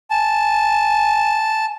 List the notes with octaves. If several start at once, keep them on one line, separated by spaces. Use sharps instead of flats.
G#5 A5